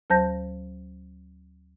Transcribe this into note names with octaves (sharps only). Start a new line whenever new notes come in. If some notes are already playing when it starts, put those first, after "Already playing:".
D2 F#3 C5 A5 G6 A#6